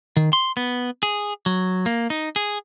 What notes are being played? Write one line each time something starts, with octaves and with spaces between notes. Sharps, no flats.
D#3
C6
B3
G#4
F#3
A#3
D#4
G#4